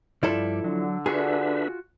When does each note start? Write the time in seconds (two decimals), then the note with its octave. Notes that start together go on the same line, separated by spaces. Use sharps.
0.23 G2 F3 G3 E4 A4 D5
0.64 D3 F#3
1.06 D4 F4 F#4 G#4 B4 E5